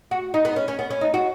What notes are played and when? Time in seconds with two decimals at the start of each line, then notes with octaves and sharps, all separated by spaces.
0.11 F#4
0.34 D#4
0.45 B3
0.56 C#4
0.68 C#4
0.79 B3
0.90 C#4
1.01 D#4
1.14 F#4